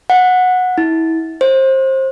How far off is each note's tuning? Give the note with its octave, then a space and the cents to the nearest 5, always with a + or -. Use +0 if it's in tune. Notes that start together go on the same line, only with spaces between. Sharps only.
F#5 -15
E4 -30
C5 +25